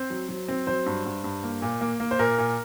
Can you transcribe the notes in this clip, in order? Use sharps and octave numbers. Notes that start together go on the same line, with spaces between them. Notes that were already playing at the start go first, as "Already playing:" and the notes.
Already playing: C4 C5
F#3
F#3
C4
F#3 C5
G2
G2
G2
A#3
A#2
A#3
A#3
C5
A#2 A#4
A#2